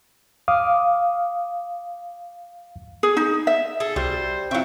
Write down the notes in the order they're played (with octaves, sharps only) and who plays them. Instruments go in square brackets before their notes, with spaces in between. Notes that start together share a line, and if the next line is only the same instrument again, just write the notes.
[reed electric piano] F5 D6 D#6
[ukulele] G#4
D#4
E5
[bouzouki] G#4 [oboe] A4
[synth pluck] C2 F#4 [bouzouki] G3 [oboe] C5
[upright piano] C3 E4 F4 [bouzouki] F#3 E5 [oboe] G5